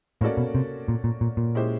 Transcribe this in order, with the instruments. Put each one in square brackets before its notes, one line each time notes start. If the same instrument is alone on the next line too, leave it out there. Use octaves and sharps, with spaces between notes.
[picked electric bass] A2 [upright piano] A#3 C#4 F#4 A4 D5
[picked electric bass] B2
C3
A#2
A#2
A#2
A#2
[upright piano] G#3 C#4 E4 G4 C5